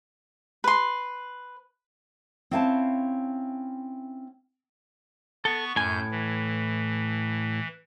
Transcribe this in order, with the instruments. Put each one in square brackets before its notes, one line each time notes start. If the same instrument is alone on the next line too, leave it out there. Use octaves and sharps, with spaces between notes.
[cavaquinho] B4 C6
[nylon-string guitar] C4 C#4 E4 F5 G#5 A5
[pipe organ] B3 C#6 [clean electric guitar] A4
[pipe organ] F#2 G6 [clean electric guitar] A2 G#5
[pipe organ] E3